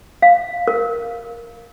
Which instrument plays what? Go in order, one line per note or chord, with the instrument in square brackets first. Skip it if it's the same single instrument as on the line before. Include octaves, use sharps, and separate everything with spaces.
[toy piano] F5
A#4